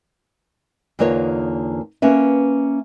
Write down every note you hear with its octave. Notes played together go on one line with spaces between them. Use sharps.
E2 D3 A#3 D#4 F4 C#5
A#3 C#4 B4 E5